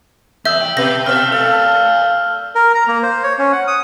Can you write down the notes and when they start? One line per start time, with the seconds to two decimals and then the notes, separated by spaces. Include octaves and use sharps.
0.45 E2 E5 E6 G6 G7
0.61 G5
0.77 B2 B4 A#6
1.06 B2 B4 E5 F6
1.32 A4 D5 F5
2.55 A#4
2.75 A#5
2.88 A#3
3.03 C5
3.23 C#5
3.39 C#4
3.52 F#5
3.67 D#6